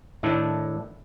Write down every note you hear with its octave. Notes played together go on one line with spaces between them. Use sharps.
A2 D#3 A3 D4 E4 A4